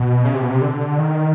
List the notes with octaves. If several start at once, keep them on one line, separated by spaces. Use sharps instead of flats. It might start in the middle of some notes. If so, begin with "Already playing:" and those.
Already playing: B2
C#3
C3
B2
C3
D3
D#3